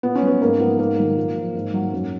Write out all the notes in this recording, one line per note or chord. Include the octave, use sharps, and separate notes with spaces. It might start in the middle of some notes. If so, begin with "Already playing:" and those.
A#2 B3
C#4
F#3
B3
G#2 A#3
F3 B3
G#2 A#3
D#3 F#3
A#2
F3
G#2
F#3
F#2